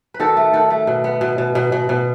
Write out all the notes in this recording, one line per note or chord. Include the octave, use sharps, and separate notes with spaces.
B4
D#3 F#4 A4
A3
D#3 F#4 A4
A3
B2
B3
B2
B2
B2
B2
B2